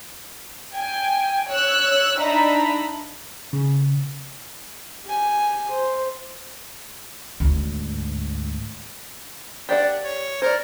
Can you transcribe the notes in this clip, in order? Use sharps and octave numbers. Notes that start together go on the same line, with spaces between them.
G5 G#5
C#5 E6 F#6
D4 D#4 E5 A#5 B5
C#3
G4 G#5
C5
D2 G#2
D4 G4 D5 F#5
C#5
A#4 C5 D5